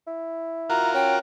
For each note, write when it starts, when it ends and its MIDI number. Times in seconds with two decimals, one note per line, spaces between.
0.07 0.93 64
0.70 1.19 65
0.70 1.19 66
0.70 1.19 70
0.70 0.94 82
0.94 1.17 61
0.94 1.16 79